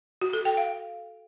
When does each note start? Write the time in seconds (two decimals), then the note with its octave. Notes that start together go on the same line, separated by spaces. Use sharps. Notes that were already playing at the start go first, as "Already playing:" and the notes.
0.21 F#4
0.33 A4
0.45 G5
0.57 F5